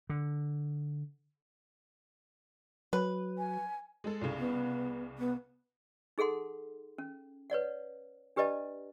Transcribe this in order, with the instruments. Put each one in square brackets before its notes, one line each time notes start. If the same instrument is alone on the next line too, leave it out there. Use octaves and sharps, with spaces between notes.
[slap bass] D3
[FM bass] F#3 [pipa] B4
[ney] G#5
[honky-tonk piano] G#3 A4
C2 C#3
[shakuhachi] B3
B3
[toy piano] D#4 G#4 A4 F#5 C6
C#4
B4 C#5 D5 F#5
D4 G4 B4 D5 D#5 A5